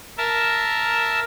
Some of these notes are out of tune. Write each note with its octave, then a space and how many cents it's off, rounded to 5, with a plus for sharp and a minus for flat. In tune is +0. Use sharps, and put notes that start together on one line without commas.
A#4 +0 E5 +0 A5 +0